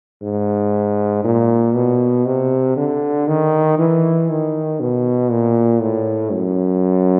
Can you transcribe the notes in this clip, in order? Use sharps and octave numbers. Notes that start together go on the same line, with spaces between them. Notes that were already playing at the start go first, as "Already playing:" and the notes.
G#2
A#2
B2
C3
D3
D#3
E3
D#3
B2
A#2
A2
F#2